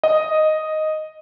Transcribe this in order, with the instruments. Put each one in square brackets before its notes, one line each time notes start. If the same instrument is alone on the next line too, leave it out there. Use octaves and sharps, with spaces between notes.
[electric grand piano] D#5